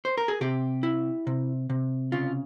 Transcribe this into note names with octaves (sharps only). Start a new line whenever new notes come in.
C5
A#4
G#4
C3 G4
E4
C3
C3
C#3 F4